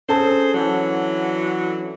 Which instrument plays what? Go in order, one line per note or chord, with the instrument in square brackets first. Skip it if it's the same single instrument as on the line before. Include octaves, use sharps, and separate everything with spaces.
[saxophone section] C4 G#4 C5 [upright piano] C#4 A4 A5
[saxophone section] D3 E3 F#3